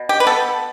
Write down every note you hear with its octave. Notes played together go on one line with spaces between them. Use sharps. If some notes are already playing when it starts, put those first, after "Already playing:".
Already playing: B2
G4
B4
B3 A4